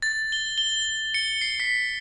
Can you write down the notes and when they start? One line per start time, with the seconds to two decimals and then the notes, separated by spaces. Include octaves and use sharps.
0.02 A6
0.32 G7
0.58 G7
1.14 C#7
1.41 C7
1.60 B6